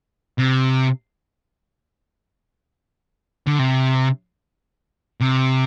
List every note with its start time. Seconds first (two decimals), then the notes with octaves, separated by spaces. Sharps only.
0.38 C3
3.47 D3
3.59 C3
5.20 C3